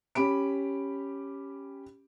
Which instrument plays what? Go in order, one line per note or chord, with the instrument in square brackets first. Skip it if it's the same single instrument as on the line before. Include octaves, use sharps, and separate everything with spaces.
[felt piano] C#4 G4 B5 D7